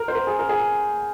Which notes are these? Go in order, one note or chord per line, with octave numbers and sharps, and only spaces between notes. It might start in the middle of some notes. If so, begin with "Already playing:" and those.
Already playing: A#4
C5
A#4
G#4
A#4
G#4
A#4